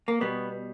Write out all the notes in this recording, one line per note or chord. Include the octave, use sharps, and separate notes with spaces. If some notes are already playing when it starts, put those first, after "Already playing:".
A#3
B2 G3 B3